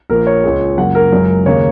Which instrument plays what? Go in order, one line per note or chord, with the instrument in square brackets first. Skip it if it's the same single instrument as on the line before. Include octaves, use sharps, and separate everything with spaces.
[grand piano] A#1 A#2 A#3 A#4
C#5
C#2 C#3 G#3
F#2 C#3 A#3 F#5
A#4
F#1 F#2 C#3 G#3
D#2 C#3 A#3 C#5